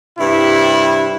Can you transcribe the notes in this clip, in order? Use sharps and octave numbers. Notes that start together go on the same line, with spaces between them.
G2 C3 E4